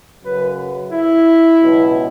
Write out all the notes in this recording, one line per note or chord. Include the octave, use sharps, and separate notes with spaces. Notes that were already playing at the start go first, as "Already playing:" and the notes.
F#2 C#3 F#3 B4
E4
C#2 B2 F#3